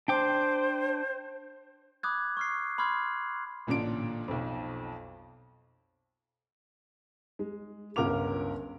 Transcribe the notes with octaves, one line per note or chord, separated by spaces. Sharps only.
D4 C5 G5 D6
B5 D6 D#6 F#6 G#6
C#6 F6 C7
B5 C6 D6 F6 G#6
A1 A#2 D3 D4 D7
B1 F2
G#3
G1 C#2 A#4 F#5 D6 F7